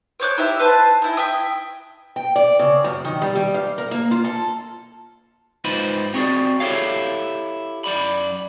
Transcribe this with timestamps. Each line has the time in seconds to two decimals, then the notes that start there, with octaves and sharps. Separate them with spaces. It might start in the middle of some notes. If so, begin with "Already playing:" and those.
0.20 C5 C#5 D6 F#6
0.37 D#4 E4 G4 E5
0.59 B4 C5 A5
1.02 D#4 E4 G#5
1.17 E5 G5 D#6
2.16 G5
2.36 D5
2.59 C#3
2.84 F#2
3.04 D#3
3.22 G3
3.35 G3
3.54 F5
3.78 A#4
3.91 A#3
4.11 F4
4.24 A4
5.64 G#2 D#4 F4 B4 C5 B5
6.14 C4 F#4 G#4 D5
6.60 E4 G4 A4 C#5 F5
7.84 F#2 D5 B5